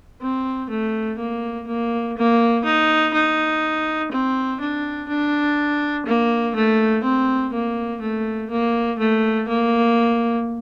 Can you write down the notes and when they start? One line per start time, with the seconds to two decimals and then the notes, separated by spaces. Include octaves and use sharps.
0.22 C4
0.70 A3
1.19 A#3
1.67 A#3
2.17 A#3
2.65 D#4
3.14 D#4
4.11 C4
4.60 D4
5.08 D4
6.06 A#3
6.55 A3
7.03 C4
7.53 A#3
8.01 A3
8.50 A#3
8.99 A3
9.48 A#3